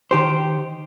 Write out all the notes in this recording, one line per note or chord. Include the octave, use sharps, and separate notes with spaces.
D#3 G4 C5